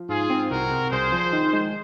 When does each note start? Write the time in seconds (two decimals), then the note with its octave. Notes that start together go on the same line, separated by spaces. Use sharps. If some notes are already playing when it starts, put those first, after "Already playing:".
Already playing: F3
0.09 G#2 F4 G#4
0.30 C4
0.50 C2 F#4 A#4
0.71 C3
0.91 C2 G#4 C5
1.12 F3
1.33 D#3
1.53 G#3